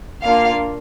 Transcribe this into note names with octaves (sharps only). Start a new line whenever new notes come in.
A#3 D4 F4 F5